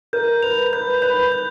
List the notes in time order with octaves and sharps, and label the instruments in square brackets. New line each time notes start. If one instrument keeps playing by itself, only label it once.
[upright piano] A#4 [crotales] G6
[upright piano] B4 [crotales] F7
[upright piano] B4 [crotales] G6
[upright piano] B4 [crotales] G6
[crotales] G6